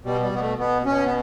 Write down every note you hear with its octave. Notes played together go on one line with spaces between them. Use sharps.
B2 G3
G3
B2 B3
A3
B2 B3
B2 C#4
B3